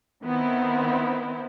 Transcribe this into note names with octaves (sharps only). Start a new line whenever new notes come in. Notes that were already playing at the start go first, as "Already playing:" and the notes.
D#3 B3 C4 E4